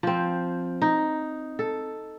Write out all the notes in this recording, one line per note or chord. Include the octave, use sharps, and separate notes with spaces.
F3 C4
D#4
A4